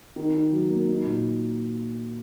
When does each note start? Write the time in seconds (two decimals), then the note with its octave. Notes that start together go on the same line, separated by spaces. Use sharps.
0.16 D#3
0.34 D#3
0.52 F#3
0.70 A#3
0.89 D#4
1.06 A#2